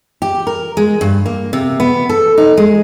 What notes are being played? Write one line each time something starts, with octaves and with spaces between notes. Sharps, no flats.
G4
A#4
G#3
G2
A#3
C3
B3
A4
D#4
G#3